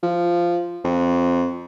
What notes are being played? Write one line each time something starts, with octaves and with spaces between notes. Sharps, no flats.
F3
F2